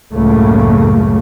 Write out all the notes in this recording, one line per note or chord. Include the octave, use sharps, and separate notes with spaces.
C#2 F#2 A2 C#3 A3 A#3